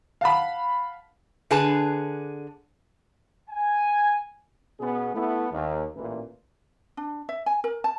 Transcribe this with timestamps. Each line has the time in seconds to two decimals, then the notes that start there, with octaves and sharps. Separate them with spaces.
0.21 F5 F#5 A5 B5
1.51 D3 D4 G#4 B4 A5
3.50 G#5
4.80 B2 B3 C#4 G#4
5.15 A3 B3 E4
5.52 D#2
5.95 A1 A#2 E3
6.97 D4
7.29 E5
7.46 G#5
7.64 A#4
7.84 A5